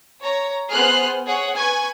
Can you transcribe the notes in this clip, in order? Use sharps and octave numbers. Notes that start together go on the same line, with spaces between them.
C#5 A#5
B3 G#4 C5 F6 F#6 C7
G#4 C#5 F#5
B4 G#5 C#6 G#6